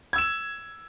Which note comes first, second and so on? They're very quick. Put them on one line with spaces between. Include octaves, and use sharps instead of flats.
G#6 E6 E7